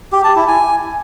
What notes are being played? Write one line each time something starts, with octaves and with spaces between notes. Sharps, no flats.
G4
A5
E4
G#5